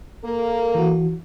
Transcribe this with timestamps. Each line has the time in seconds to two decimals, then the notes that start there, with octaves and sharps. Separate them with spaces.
0.24 A#3 A4 A#4
0.75 E3 F#4